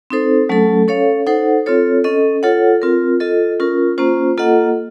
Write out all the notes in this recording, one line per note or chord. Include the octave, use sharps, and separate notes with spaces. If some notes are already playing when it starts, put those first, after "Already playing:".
C4 D#4 A4 C5
F#3 A3 C#4 A4
C#4 A4 C#5 F5
D#4 A4 C5 F#5
C4 F4 A4 C#5
C#4 A4 D#5
F4 A4 C#5 F#5
C4 F4 A#4
F4 A4 D#5
C#4 F4 A#4
A#3 C#4 F4 C5
A#3 F4 A4 D#5 F#5